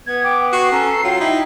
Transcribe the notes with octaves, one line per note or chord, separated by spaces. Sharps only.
B3 G#6
G5 D6
F#4 C#6 C7
C#4 A4 A#5
F#3 F4 G5
D#4 E4